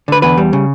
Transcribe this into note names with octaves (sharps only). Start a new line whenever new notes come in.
D3 B4
E2 B4
G3
C#3